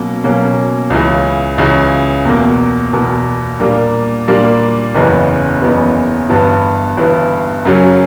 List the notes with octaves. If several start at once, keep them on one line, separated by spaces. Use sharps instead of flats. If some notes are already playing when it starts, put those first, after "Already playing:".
Already playing: B2 F#3 A#3 C#4
B2 F#3 A#3 C#4
C#2 C#3 E3
C#2 C#3 E3
E2 B2 A#3
E2 B2 A#3
A#2 G3 A#3 D4
A#2 G3 A#3 D4
F#1 E2 C#3 E3 B3
F#1 E2 C#3 E3 B3
G1 G2 E3 B3
G1 G2 E3 B3
F#2 C#3 F#3 C#4